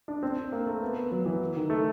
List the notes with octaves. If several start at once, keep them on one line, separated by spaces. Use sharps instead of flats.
D4
C4
A#3
A3
B3
B3
F#3
E3
D#3
A3